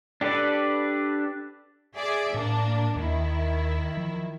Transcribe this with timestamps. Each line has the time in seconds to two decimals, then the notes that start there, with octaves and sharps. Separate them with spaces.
0.21 D4 G4 A4 B4 D5
1.97 G#4 D5 E5
2.34 A2 A#3 D4
2.96 D#2 D#3 E4
3.97 F3